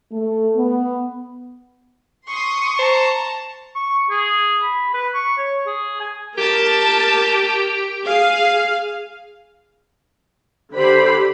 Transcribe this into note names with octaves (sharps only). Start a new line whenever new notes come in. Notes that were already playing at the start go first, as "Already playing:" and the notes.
A3
B3
C6 C#6 D#6
C5 A5 A#5
C#6
G#4
B5
B4
C#6
C#5
G#4
G#5
G4 A#4 A5
G#4 F5
D3 G4 C5 B5